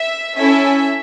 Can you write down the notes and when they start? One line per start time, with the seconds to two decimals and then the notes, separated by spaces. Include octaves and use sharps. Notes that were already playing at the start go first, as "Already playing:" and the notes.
Already playing: E5
0.37 C#4 E4 A4 E5